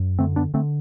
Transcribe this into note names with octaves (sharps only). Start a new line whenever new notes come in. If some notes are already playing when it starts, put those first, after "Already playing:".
Already playing: F#2
D3 A3 C4
B3 D4
D3 A3 C4